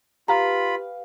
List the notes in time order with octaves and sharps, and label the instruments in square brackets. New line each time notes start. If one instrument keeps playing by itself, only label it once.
[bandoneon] F4 B5 [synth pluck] G4 B4 F5 [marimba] A#5